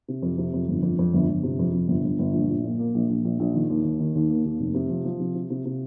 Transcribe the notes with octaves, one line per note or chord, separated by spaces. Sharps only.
C3
F2
C3
F2
G1
F2
F2
G1
G1
C3
F2
C3
G1
G1
G1
A#1
A#1
A#2
A#3
A#1
A#1
A#1
A#1
D#3
D#2
D#2
D#3
D#2
A#3
D#2
F1
C3
F3
F3
C3
C3
C3
C3